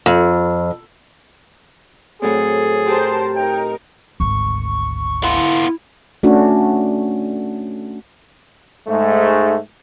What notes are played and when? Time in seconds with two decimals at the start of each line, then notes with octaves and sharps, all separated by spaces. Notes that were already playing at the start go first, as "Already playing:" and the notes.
0.06 F2
2.22 A2 F#3 C4 G#4 A4
2.88 G4 A#4 C5 A5
3.36 D#4 A#4 G5
4.20 G#1 D2 C#6
5.24 B3 E4 F4
6.23 A3 C#4 D4 F#4
8.88 G#2 A3